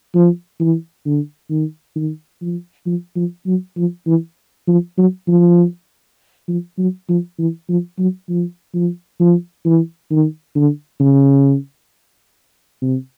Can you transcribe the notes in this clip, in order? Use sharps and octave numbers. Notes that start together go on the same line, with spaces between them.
F3
E3
D3
D#3
D#3
F3
F3
F3
F#3
F3
E3
F3
F#3
F3
F3
F#3
F3
E3
F3
F#3
F3
F3
F3
E3
D#3
D3
C#3
C3